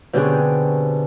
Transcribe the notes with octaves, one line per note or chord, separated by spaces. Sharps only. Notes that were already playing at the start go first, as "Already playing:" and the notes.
B2 D3 C4 C#4 G4 G#4